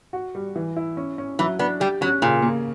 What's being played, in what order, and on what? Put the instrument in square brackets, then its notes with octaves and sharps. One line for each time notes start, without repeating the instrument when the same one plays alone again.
[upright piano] F#4
G3
E3
E4
C#4
C#4
[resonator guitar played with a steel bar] E3 [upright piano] F#3
[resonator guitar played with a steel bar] B3 [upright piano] D4
[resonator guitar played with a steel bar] G3 [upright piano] G4
[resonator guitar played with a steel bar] F#3 [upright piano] C#4
[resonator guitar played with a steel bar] A#2 [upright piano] C#3
[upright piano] A#3